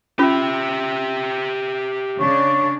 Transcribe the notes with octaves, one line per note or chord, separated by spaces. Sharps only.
C#4 F4 G4 E5
C#3 D4 C#5